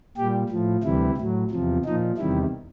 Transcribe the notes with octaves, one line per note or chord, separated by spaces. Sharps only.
A#2 G3 G4
A2 F3
D2 C3 E3 G3 E4
A2 F#3
E2 C3 F3
A#2 F3 D#4
E2 C3 D#3 G3 E4